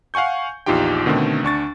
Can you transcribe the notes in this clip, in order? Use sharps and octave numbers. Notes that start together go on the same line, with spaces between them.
F5 F#5 G#5 C#6 G6
A#1 E2 D#4 F4 G4 G5
B2 D3 D#3 A3 C4
D2 D4 C#6 A6